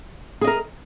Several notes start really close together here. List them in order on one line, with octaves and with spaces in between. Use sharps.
G#4 D#5 A#4